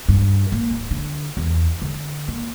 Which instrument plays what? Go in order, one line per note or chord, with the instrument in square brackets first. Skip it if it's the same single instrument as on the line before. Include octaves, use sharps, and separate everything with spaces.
[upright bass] G2
A#3
D1
D3
E2
D3
A#3